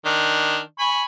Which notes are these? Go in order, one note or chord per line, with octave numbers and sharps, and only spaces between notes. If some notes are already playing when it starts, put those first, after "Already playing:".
D#3 D4
G#5 B5 C#6